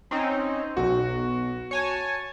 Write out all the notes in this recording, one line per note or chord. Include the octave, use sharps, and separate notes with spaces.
C4 C#4 D#4
B1 F#4
C#5 G#5 A5